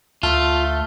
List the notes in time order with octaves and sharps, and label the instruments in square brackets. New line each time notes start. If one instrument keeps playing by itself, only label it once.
[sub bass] D2 [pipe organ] A3 [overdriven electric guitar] F4 [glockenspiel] A5 F6 G7